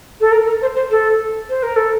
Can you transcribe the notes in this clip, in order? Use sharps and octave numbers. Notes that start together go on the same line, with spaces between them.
A4
A#4
A#4
C5
C5
A4
C5
A#4
A4